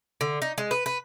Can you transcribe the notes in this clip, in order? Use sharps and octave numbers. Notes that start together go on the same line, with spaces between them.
D3
D#4
G#3
B4
B4